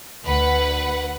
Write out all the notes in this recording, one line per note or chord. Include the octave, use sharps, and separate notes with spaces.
D2 B4 F#5